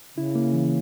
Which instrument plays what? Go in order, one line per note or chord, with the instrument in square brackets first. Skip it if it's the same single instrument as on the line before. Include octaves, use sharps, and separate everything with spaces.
[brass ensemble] C#3 [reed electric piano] E4
[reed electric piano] A#3
E3